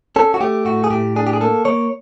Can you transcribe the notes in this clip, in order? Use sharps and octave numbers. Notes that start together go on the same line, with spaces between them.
C#4 A4
F#4
A3 G4
A2 F#4
G#4
A2 G4
D4 G#4
G4
G#4
A#3 A4
A#3 C#5